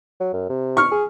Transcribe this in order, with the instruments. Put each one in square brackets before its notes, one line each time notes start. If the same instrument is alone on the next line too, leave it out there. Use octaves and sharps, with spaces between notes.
[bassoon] F#3
F#2
C3
[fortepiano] C#6 F6
[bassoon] G#4